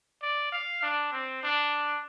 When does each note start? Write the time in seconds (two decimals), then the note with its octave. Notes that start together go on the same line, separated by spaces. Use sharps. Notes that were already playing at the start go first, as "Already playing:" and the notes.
0.22 D5
0.52 F5
0.83 D4
1.13 C4
1.43 D4